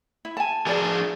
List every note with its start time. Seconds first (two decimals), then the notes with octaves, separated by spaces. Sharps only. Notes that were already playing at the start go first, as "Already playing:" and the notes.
0.25 E4
0.37 G#5 A5
0.67 F3 G#4 B4 D5 A5
0.85 D4